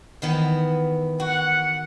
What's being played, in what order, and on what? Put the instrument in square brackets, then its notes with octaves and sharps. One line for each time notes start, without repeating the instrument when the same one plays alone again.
[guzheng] D#3 E3 B3
[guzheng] F#4 [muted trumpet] F#5